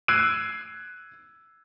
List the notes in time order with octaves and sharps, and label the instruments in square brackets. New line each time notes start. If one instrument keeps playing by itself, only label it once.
[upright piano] E6 F#6 G#6 C7 D7 D#7